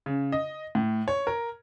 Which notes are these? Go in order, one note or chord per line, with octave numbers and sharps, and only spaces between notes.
C#3
D#5
A2
C#5
A#4